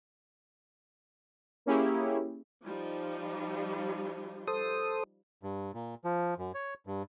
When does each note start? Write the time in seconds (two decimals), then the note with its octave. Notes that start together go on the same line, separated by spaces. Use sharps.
1.66 A#3 C#4 E4 G4 G#4
2.65 F3 G3 D#4
4.47 A4 C5 D#6
5.43 G2
5.74 A#2
6.04 F3
6.38 F#2
6.54 C#5
6.87 G2